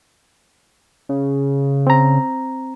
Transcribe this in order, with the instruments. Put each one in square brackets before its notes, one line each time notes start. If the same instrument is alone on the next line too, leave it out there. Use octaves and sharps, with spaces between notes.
[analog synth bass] C#3
[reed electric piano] C4 A#5